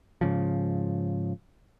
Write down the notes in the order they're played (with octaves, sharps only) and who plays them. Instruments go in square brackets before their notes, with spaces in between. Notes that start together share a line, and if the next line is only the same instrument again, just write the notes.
[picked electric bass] G#2 C#3 F3